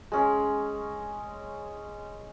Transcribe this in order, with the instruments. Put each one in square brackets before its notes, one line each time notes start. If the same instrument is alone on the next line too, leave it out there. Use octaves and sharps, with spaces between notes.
[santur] G#3 C#4